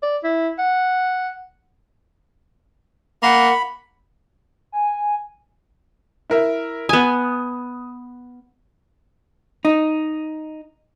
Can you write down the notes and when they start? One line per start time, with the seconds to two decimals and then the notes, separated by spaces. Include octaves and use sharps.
0.03 D5
0.24 E4
0.59 F#5
3.23 A#3 F#5 B5
4.72 G#5
6.30 E4 A#4 E5
6.89 B3 G#5 D#6
9.65 D#4